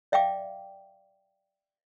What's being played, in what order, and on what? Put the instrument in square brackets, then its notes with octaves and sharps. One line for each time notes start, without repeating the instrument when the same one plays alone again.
[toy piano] D5 E5 F5 G5 D6